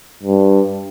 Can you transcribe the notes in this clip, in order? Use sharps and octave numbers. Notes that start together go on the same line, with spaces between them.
G2